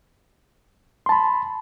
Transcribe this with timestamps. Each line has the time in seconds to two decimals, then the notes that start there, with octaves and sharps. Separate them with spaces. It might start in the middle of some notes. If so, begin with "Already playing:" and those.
1.06 C6
1.09 A5
1.12 B5